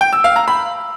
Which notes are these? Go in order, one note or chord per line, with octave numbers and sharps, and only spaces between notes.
G5
E6
F5
A#5
B5